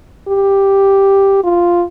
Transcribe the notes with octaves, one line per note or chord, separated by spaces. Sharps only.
G4
F4